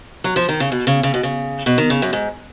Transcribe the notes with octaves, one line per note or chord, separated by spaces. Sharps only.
F#3
F3
D#3
C#3
B2
C#3
C#3
B2
C#3
B2
D#3
C#3
F#2
G#2